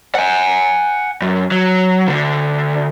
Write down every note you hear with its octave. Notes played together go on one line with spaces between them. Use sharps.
F#5 G#5
F#2
F#3
D2 D3